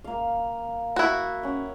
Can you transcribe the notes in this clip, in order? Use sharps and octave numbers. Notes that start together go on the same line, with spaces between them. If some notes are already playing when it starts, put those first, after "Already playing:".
A#3 F5
E4 F#4
C#4 F#5